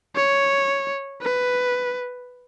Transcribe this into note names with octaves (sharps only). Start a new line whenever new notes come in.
C#5
B4